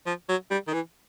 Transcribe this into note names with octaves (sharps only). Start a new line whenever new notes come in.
F3
F#3
G3
D#3
E3